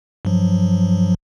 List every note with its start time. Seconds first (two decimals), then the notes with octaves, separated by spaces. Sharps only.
0.25 G2 F3 F#3